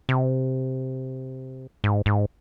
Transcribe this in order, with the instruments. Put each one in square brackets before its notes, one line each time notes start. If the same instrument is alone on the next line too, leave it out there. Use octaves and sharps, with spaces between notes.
[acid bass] C3
G#2
G#2